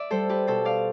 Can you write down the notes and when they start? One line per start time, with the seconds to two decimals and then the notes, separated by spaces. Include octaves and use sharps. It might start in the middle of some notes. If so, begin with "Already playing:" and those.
Already playing: D5 E5
0.11 G3 A4 C5
0.29 G4 B4
0.47 B2 A4 C5
0.65 D5 F5